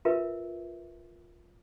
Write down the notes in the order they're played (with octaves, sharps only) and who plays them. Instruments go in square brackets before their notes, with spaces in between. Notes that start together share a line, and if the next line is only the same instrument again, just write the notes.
[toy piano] F4 A#4 B4 E5